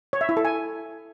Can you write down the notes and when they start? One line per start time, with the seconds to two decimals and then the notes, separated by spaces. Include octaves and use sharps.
0.13 C#5
0.21 E5
0.29 E4
0.37 A4
0.45 G#5